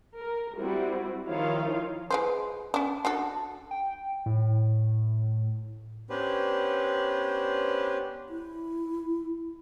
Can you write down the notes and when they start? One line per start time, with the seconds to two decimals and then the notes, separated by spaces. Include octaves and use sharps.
0.20 A#4
0.59 G3 C4 E4 F#4
1.28 D#3 F3 E4 F4 C#5 F5
2.10 G#3 B4 C5
2.74 C#4 D4
3.05 D4 F#4 A4
3.71 G5
4.26 A2
6.10 B3 C#4 D4 G4 B4 C5
8.29 E4